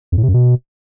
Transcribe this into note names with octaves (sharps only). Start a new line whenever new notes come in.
F2
A2
C3
F#2
B2